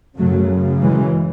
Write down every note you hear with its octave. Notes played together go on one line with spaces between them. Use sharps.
F#2 C#3 F#3 A3
E3 G#3